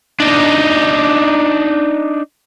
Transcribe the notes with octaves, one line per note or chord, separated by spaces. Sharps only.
D4 D#4